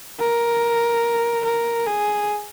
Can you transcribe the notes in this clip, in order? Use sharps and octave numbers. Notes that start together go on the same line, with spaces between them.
A#4
A#4
G#4